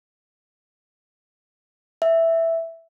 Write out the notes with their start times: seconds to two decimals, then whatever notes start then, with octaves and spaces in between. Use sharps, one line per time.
2.02 E5